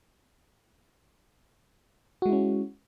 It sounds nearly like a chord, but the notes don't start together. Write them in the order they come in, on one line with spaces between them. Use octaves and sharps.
F#4 G#3 E4 C#4